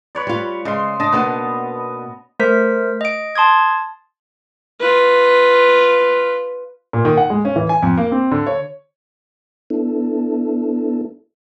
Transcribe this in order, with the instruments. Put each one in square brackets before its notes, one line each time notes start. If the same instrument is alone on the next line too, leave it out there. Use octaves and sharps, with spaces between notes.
[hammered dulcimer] B4 C#5 D5
[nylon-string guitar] G3 F4
[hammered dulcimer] C#3 C6 [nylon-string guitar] G#3
[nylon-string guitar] D4 [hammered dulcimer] D#5 A5
[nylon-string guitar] B2 A#3 D4 [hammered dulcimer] B3
[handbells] A3 A#4 C5 B6
D#5 D7
A5 C6 D#6 G#6
[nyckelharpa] F4 B4
[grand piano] A#2
D#3
F#5
G#3
C#4
E3
G#5
F2
A#3
C4
D3
C#5
[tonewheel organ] B3 D4 E4 A4